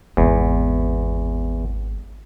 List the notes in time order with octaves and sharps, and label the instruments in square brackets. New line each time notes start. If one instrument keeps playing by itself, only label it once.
[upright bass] G#1 B3 [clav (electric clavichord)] E2